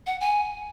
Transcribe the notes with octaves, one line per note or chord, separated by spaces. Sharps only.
F#5
G#5